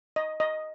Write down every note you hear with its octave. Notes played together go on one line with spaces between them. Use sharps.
D#5
D#5